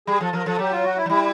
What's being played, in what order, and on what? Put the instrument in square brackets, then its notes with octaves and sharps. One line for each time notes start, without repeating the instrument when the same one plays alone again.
[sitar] G3 [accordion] G#4
[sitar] F3 [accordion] A4
[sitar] F3 [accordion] A#4
[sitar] F3 [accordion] A4
[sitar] F#3 [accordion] G4
[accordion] F4
F#4
E4
[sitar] F#3
[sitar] G3 [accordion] E4